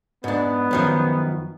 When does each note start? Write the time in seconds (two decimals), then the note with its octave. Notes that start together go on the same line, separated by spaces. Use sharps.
0.24 G#2 B3 D4
0.71 F#2 D#3 F3